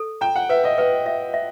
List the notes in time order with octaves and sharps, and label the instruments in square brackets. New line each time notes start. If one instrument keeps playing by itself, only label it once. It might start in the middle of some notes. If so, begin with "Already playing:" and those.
Already playing: [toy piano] A4
[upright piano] G5 [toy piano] A#5
[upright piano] F#5
[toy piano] B4 [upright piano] E5
[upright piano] D#5
[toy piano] B4 [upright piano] D#5
[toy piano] E5
E5